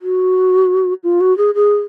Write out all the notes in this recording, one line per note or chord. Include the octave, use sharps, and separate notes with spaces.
F#4
F4
F#4
G#4
G#4